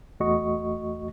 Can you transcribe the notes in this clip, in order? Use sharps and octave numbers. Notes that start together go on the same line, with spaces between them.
E2 A3 F#4 D#5 C#6